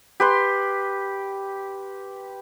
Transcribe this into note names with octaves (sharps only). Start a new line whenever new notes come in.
G4 B4 C6